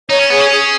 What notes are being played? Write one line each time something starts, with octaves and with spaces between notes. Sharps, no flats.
D#4 C#5
C#4
B3 G#4
C#4
G#4